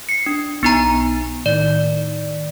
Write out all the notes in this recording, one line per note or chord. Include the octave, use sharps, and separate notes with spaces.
C7 C#7
D4
B1 B3 D#4 A#5
A2 D#3 D5